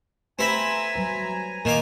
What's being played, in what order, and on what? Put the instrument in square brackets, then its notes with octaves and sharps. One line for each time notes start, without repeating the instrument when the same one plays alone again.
[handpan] A3 G4 B4 [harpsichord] C4 E5 B5 [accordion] G#5 A#5
[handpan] F#3 G3 B4
[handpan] A#2 A#3 A#4 [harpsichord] D#3 F5 D6